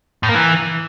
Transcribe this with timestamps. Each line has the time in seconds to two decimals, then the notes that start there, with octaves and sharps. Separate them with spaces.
0.23 A2
0.29 A#3
0.35 E3